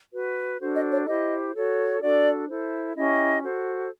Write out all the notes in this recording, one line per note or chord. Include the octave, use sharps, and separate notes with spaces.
F#4 B4
D4 F#4 A4 C5
D#5
C#5
E4 G4 C5 D#5
F#4 A4 C#5
D4 F#4 A4 D5
E4 A4 C5
C#4 E4 G4 D#5
F#4 A4 C5